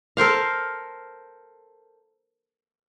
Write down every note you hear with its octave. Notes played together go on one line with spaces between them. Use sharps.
A4 A#4 C5 F5